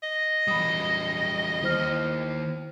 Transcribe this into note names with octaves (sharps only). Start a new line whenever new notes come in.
D#5
E2 G3 B5 D#6
D#2 E4 C5 F6